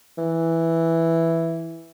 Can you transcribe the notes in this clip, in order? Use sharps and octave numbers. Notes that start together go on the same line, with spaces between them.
E3